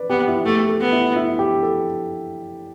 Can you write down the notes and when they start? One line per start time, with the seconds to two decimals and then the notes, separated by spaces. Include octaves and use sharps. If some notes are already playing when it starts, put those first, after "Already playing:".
Already playing: B4 D5
0.10 B3 G4
0.28 E4
0.45 A3 G4
0.69 A4
0.80 B3
0.92 E4
1.16 E4
1.39 G4
1.63 A4